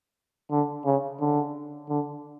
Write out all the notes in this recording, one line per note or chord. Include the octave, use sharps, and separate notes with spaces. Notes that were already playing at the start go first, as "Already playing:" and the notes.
D3
C#3
D3
D3